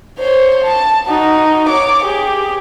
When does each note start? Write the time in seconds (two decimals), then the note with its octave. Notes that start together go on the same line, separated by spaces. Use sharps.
0.19 C5 C#5
0.64 A5
1.07 D#4 F#4
1.69 C#5 D6
2.04 G4 G#4